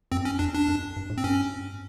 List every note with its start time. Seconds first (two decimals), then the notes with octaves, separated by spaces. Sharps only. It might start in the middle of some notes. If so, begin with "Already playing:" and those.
0.12 F#2 C4
0.25 C#4
0.39 F2 D4
0.54 D4
0.68 F#2
0.96 G2
1.10 A2
1.18 C4
1.24 G2 C#4